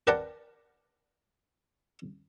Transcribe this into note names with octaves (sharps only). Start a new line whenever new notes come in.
A#4 B4 D5 F#5 G5 A5